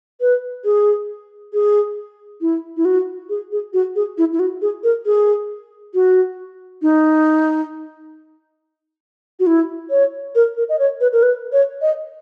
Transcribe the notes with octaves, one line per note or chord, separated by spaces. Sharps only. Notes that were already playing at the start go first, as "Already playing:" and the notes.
B4
G#4
G#4
E4
E4
F#4
G#4
G#4
F#4
G#4
E4
E4
F#4
G#4
A#4
G#4
F#4
D#4
F#4
E4
C#5
A#4
A#4
D#5
C#5
B4
A#4
B4
C#5
D#5